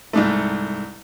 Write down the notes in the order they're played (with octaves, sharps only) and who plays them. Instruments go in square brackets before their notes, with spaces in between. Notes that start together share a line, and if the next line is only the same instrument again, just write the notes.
[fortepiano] C2 G#2 A3